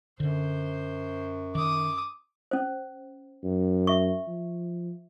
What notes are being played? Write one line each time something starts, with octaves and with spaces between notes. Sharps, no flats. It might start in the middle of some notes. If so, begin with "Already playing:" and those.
F#2 D3 C5
D#3 D6 D#6
C#4 C5
F#2
E5 C#6
F3